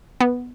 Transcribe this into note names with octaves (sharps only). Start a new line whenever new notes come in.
B3